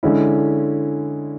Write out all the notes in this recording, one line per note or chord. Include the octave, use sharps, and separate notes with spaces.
D3 G#3 C#4 E4